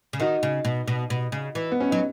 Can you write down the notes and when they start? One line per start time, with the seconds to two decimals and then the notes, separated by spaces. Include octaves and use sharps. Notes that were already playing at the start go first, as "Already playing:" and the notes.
0.13 C#3
0.20 D#3 D#4 F#4
0.43 C#3
0.65 B2
0.88 B2
1.10 B2
1.32 C#3
1.55 E3
1.72 B3
1.80 C#4
1.90 F#3 D#4